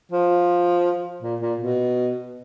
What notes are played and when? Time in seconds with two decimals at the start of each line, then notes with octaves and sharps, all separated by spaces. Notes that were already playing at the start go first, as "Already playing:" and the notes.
0.12 F3
1.22 A#2
1.41 A#2
1.60 B2